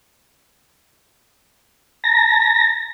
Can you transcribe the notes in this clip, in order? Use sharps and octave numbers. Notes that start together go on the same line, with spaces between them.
A5 A#5 A#6